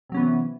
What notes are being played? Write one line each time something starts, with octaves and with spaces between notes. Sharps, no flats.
C3 E3 F#3 B3 C#4